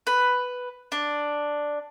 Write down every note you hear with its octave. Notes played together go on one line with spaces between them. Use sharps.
B4
D4